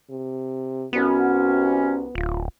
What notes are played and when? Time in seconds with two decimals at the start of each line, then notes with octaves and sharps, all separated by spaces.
0.10 C3
0.93 C2 B3 C#4 F#4
2.15 D1 F4